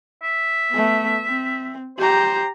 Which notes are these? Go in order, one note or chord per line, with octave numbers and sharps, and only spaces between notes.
E5
A3 B3
C4
G4 C5 A#5